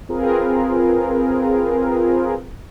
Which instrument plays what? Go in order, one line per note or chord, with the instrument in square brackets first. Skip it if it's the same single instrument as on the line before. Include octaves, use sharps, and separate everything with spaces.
[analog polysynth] C4 F4 G#4 A#4 B4